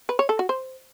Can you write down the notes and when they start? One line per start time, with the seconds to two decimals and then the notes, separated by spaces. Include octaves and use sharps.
0.09 B4
0.19 C#5
0.29 A4
0.39 F#4
0.49 C5